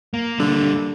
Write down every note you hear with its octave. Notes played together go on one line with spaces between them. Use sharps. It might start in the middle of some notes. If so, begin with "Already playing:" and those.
A#3
D3 G3 A#3